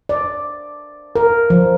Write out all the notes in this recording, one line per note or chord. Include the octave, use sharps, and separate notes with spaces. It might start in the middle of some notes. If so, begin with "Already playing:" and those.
D5
A#4
F3